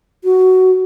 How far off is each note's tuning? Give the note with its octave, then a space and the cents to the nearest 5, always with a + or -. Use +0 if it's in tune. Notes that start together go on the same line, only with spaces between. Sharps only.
F#4 +10